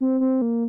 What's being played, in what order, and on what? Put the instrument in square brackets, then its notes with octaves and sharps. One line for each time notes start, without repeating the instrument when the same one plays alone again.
[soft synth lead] C4
C4
A#3